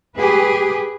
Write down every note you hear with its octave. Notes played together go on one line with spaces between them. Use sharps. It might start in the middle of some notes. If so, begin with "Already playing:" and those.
G4 G#4 B4